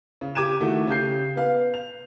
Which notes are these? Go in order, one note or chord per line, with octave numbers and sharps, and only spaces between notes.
C#3
G4 D6 G#6 D#7 E7
D#3 A3 E4 F#4 A4
C#3 G4 G6 C7
B3 B4 F5
F7